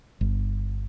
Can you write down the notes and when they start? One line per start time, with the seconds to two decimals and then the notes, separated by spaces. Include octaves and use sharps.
0.21 G1